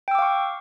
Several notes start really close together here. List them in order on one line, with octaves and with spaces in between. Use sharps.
G5 E6 D6 F5 C#6